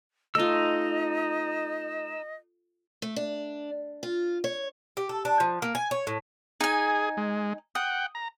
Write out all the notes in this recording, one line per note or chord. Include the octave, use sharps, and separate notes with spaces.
A3 D#4 F4 D#5 E6
A3
D4
F4
C#5
G4
A4
D4
F3
A#3
G#5
C#5
A2
D#4 G#4 G#5
G#3
F#5 G5 D#6
A#5